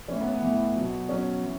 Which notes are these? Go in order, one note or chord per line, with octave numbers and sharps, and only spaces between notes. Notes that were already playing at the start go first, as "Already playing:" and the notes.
A2 E3 C#4
B3
B3
A2 E3
F#3
B2
B2 F#3 C#4
E3